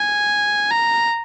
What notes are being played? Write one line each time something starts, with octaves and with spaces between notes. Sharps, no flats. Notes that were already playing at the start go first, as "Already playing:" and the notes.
Already playing: G#5
A#5